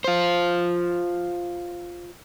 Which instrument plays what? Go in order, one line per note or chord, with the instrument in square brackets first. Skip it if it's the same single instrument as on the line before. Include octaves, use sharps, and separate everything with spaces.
[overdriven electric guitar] F4 C5